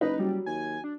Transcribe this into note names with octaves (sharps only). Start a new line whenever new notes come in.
F#1 D#4 B4
F#3 G3
D#2 G#5
D4